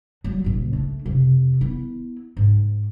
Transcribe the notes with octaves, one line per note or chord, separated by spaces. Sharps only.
F#3 G3
F#1 A#2
A3 D4
F2 C3
B3 E4
G#2